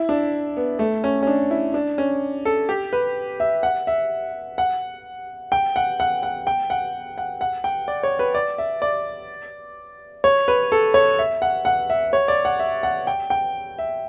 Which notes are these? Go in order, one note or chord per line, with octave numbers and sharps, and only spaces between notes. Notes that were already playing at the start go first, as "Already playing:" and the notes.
Already playing: E4
D4
B3
A3
C#4
C#4
D4
E4
D4
C#4
A4
G4
B4
E5
F#5
E5
F#5
G5
F#5
F#5
F#5
G5
F#5
F#5
F#5
G5
D5
C#5
B4
D5
E5
D5
C#5
B4
A4
C#5
E5
F#5
F#5
E5
C#5
D5
F#5
E5
F#5
G5
G5
E5